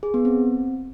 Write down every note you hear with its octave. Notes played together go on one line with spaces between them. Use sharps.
G#4
B3
C4